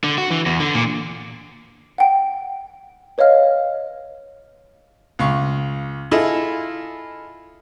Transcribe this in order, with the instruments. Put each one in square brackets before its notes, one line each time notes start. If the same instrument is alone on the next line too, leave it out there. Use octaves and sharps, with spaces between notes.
[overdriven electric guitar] D3
F#4
E3
E2
D3
A#2
[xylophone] F#5 G5
B4 C#5 D#5 F5 F6
[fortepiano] C#2 F5 C#6
E4 F4 G#4 A4 D#5 E5